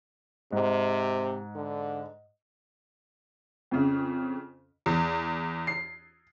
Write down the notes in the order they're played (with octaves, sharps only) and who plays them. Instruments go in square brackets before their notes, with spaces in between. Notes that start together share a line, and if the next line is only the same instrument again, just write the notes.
[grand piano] G#2 [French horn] C3
[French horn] D3
[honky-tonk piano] F2 C#3
E2
C7